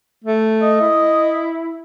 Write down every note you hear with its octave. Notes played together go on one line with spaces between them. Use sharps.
A3
D#5
E4